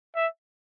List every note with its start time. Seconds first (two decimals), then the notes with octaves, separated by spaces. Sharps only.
0.16 E5